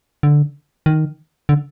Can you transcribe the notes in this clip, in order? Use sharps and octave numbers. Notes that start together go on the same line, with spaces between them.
D3
D#3
D3